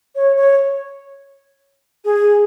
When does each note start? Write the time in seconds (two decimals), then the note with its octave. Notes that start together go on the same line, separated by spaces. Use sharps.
0.15 C#5
0.36 C#5
2.05 G#4